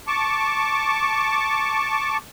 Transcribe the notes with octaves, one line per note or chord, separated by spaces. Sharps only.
A5 C#6 D6